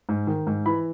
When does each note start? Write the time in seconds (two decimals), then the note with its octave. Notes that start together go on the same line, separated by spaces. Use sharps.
0.09 G#2
0.27 D#3
0.47 G#2
0.66 E3 B5